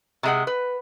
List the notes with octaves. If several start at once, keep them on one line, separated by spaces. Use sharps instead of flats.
C3 G#3 F#5
B4